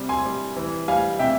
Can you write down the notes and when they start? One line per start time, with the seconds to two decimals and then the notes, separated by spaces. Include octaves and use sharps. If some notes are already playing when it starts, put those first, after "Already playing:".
Already playing: C3 G3
0.09 G#5 C6
0.26 G3
0.56 E3
0.88 G3 F5 G#5
1.19 C3 E5 G5